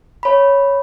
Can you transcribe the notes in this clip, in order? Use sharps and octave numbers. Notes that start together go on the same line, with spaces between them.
C#5 B5